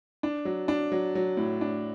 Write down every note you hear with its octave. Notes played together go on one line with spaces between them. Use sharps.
D4
F#3
D4
F#3
F#3
A2
D4